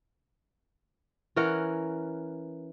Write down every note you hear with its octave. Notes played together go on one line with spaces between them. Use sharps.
E3 C#4 A#4 F#5